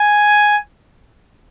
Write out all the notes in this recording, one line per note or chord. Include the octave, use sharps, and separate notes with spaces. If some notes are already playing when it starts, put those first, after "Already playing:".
Already playing: G#5